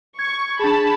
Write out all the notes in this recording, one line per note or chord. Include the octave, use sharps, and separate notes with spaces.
C#6 G#6
D4 G#4 A5 B5